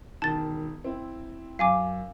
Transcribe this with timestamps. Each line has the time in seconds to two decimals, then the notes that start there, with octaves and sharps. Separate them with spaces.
0.22 E1 D#3 A5 A6
0.84 C4 E4
1.59 F#2 F5 G#5 D6